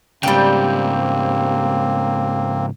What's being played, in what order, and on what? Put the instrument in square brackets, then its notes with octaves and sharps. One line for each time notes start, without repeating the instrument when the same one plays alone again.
[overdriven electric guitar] G#2 C#3 [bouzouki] G3 G5 [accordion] A#3 C4